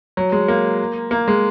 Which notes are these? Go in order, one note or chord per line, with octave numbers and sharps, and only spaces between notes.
F#3
G#3
A#3
A#3
G#3